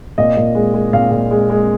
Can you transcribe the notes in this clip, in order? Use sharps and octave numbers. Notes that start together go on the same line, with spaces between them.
A#2 D#5
A#2
G#3
G#3
A#2 F5
A#2
G#3
G#3